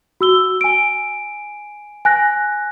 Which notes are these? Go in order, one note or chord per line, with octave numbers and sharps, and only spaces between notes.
F#4 E6 G7
G#5 D7
G#5 F#6 A#6